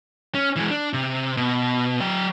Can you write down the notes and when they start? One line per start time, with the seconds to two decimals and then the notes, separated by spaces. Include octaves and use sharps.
0.35 C#4
0.56 E3 G#3
0.71 D4
0.93 C3
1.37 B2
2.01 F#3 G5